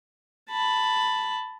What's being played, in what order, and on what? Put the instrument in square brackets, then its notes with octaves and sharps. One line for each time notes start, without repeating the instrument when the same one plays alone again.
[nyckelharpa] A5 B5